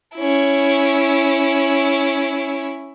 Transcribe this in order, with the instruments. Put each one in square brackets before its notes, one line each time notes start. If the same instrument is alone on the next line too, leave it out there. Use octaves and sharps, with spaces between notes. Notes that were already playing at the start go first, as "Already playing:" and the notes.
[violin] C#4 E4